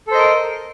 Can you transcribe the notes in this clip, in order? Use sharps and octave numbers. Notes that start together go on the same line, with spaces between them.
A4 A#4 C5 D#5